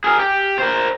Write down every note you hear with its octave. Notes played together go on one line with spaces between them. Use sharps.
G#4 A#4
G4
A#4 C5